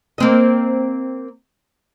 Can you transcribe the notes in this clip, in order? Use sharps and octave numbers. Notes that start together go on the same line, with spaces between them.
A#3 C4 D#5